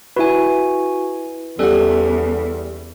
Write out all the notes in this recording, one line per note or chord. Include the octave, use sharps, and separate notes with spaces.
E4 F#4 B4 G#5
E2 G3 C#4 A4 F#5